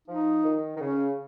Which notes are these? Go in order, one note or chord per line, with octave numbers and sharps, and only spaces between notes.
F3 D#4
D#3
D#3
C#3 C#4